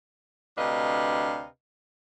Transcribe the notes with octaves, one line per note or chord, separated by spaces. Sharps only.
D2 C3 D4 B4 D#5 F5